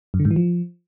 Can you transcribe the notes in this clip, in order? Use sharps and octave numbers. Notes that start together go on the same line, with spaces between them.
F#2
D3
G#2
E3
F3